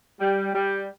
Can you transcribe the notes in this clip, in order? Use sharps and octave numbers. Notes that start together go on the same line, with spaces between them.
G3
G3